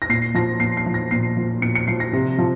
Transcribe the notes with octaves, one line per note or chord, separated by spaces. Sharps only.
A#6
A#2 C7
F3 A#6
A#2 C7
C7
F3
A#6
A#2 C7
F3
A#2 C#7
C#7
F3 C7
A#6
C3
F3